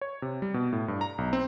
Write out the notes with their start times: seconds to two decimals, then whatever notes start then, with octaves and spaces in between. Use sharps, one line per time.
0.01 C#5
0.22 C3
0.42 G3
0.54 B2
0.72 A2
0.88 G2
1.01 A#5
1.18 B1
1.33 C4